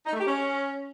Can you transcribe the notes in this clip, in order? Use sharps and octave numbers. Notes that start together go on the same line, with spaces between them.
D#4
A3
G4
C#4